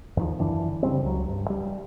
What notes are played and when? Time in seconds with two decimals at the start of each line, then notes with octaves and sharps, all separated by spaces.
0.17 E2 D#3 F3
0.39 F#2 D3 E3 D4
0.83 C#3 G3 C4
1.03 C#2 F#3
1.28 G2
1.50 G3